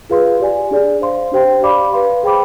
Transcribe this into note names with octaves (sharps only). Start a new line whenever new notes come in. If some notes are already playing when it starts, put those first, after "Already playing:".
F4 G#4 B4 F5 C6
G4 D5 G#5
D4 G#4 D5
C5 F5 C6
D4 G4 C5 G5 C6
G4 D5 F5 B5 D6
B4 F5 C6
G#4 C5 G5 B5 D6